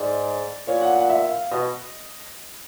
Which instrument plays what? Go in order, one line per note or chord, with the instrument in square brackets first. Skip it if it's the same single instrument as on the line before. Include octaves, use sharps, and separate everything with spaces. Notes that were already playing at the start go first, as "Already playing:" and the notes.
Already playing: [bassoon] G#2 [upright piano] D5
[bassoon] A#2 [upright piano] C#5
[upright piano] F#5
F#5
E5
F5
[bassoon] B2 [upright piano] D#5